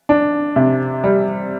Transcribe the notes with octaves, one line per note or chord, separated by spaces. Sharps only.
D4
C3
G3